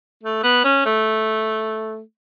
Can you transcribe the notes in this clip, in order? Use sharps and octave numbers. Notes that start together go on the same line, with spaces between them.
A3
B3
C#4
A3